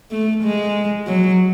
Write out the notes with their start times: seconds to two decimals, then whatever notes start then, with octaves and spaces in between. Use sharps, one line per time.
0.11 A3
0.43 G#3
1.07 F#3